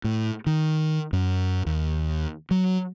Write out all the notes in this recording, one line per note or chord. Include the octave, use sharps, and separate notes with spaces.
A2
D#3
F#2
D#2
F#3